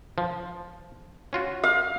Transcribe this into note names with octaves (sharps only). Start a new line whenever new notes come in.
F3
C#4 F4 F#4
F5